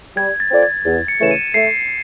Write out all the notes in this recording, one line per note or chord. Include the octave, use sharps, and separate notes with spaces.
G3 G#6
A6
C4 F4 A4 D5
G#6
E2 A6
C#7
C#3 E3 A3 E7
D#7
A3 C7